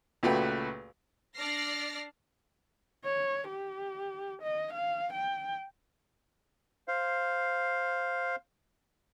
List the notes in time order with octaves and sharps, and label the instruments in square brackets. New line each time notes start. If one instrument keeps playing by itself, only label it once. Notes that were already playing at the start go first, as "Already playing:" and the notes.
[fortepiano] C#2 A#2 A3 F#4 B4 G5
[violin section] D4 D5 F6 A#6 C7
[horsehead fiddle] C#5
G4
D#5
F5
G5
[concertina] C5 F5